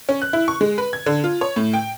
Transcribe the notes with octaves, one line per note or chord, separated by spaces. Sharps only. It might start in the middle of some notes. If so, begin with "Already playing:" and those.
C#4
F#6
E4
C#6
G#3
B4
G#6
D3
F4
C#5
A2
G5